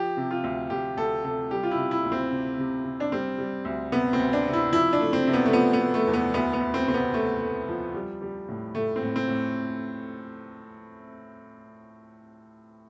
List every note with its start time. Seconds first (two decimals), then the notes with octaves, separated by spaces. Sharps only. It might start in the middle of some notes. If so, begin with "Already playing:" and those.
Already playing: F3 G4
0.17 C3
0.31 F4
0.44 D2
0.70 D2 G4
0.97 D2 A4
1.24 C3 A4
1.51 G3 G4
1.63 F4
1.71 E4
1.77 C3
1.91 E4
2.05 D2
2.12 C4
2.31 C3
2.58 C3
2.84 C3
3.00 D4
3.12 G3 C4
3.38 G3
3.65 D2
3.92 C3 B3
4.13 C4
4.19 D2
4.33 D4
4.47 C3
4.53 E4
4.72 F3 E4
4.93 D4
5.00 A3
5.13 C4
5.27 C3
5.33 B3
5.45 A3
5.53 F3 B3
5.73 B3
5.81 A3
5.94 A3
6.07 E2
6.13 B3
6.34 D2 B3
6.53 B3
6.61 D2
6.74 C4
6.87 C3 C4
6.94 B3
7.14 A3
7.41 A3
7.68 F3
7.94 G3
8.22 G3
8.49 A2
8.75 A2 A3
8.96 C4
9.02 A2
9.16 C4
9.28 A2